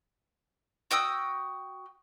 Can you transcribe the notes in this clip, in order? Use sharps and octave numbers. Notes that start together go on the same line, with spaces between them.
F#4 G5 D#6 E6